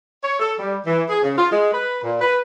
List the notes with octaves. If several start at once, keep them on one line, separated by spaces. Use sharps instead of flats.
C#5
A4
G3
E3
G#4
C#3
F4
G#3
B4
A#2
B4